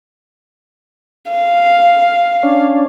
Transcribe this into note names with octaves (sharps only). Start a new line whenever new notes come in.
F5
C#4 D4